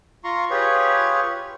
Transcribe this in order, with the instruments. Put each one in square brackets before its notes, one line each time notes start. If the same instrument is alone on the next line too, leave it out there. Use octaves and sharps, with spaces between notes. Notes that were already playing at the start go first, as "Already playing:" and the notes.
[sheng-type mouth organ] F4 A#5 C6 C#6
F4 G4 G#4 B4 C#5